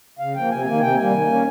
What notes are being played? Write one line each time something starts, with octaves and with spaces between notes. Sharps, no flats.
C#3 F5
F3 A#3 G5
C3 G#5
D#3 A#3 G#5
C3 G5
G3 A#3 G#5
D#3
A#3 C#4